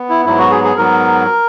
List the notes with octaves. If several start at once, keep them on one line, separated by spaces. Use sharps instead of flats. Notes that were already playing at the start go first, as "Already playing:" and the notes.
Already playing: B3
E4
G#2 F#3 B3 E4
F#4
G#4
G#4
G#2 F#3 B3 A#4